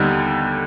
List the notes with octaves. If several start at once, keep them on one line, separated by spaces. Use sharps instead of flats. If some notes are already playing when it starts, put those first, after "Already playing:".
Already playing: D#2 D3 G3 B3 D#4